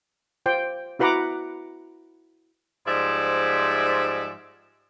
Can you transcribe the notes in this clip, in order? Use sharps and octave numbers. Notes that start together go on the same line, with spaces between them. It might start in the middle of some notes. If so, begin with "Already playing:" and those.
F4 C5 G5
E4 F#4 B4 F#5 A#5 D6
G#2 F3 G3 D5 E5